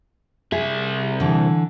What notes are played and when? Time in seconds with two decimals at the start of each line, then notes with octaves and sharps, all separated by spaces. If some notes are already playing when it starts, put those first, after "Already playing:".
0.52 C2 G#4 E5
1.20 D3 E3